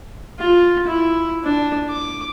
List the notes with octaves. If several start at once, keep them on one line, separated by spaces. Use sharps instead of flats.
F4
E4
D4
D6